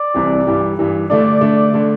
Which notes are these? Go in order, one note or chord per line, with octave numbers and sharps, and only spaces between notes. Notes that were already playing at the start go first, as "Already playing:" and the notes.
Already playing: D5
C2 C3 E3
G2 E3 G3
G2 E3 G3
D3 A3 D4 D5
D3 A3 D4
D3 A3